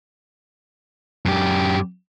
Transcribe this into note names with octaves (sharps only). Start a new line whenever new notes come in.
F#2 G4